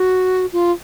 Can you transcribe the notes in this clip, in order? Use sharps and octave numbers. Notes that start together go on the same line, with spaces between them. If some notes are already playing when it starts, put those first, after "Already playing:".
Already playing: F#4
F4